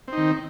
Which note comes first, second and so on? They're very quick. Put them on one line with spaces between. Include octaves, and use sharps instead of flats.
C4 D#4 D#3